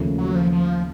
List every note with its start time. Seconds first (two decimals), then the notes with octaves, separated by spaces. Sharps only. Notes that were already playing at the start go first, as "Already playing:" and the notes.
Already playing: D#2 C#3 F3 A3 C#4
0.18 F#3
0.35 F3
0.52 F3